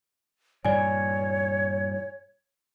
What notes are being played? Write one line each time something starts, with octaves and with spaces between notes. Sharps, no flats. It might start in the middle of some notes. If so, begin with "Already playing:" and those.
G2 A#2 E3 C#5 D5 G#5